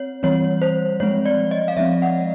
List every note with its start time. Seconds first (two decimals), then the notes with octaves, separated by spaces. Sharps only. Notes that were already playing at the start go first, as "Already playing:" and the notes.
Already playing: C4 C#5
0.23 E3 G3 C4 C#5
0.62 C5
1.00 F3 G#3 C4 C#5
1.25 D5
1.51 D#5
1.68 F5
1.77 F3 G#3 C4 E5
2.02 F#5